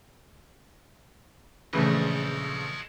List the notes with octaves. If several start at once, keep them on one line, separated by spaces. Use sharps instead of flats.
A#1 C#3 E3 A3 A4 D#5